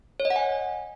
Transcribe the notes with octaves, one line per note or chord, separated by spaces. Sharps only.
C#5
D#5
F#5
G#5